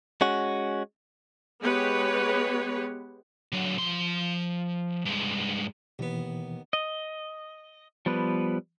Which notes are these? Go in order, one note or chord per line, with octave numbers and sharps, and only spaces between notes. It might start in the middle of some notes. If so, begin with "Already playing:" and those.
G#3 C#4 F#4
G#3 B3 G4 B4 C#5
D3 F#3
F3 C6
G2 G#3
D#2 B2 E3 B3
D#5
F3 G3 B3 B4